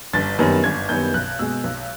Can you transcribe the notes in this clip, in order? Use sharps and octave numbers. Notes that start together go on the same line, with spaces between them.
G1 A6
F#2 D#3 G3 B3
G1 G#6
F#2 D#3 G3 B3 G6
B1 F#6
B2 G#3 E6
B1